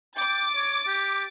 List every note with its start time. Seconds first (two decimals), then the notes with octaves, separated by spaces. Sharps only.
0.16 G5 D6 A6
0.55 C#5
0.87 G4